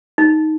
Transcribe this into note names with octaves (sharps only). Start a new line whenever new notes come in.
D#4